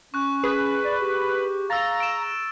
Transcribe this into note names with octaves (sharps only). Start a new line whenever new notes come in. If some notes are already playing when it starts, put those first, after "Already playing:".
C#4 C#6 F#6
G#4 B4
D5
G4
F5 A#5 E6 A6
D7 E7